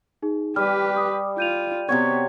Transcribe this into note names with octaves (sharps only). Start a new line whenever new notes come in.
D#4 G#4
G3 G4 B4 F6
D6 D#6
F4 G6 D#7 F7
C3 B3 F#4 C#5 G#6